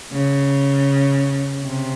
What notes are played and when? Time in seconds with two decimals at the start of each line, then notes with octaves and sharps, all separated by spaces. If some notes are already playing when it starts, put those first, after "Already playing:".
0.12 C#3
1.64 C3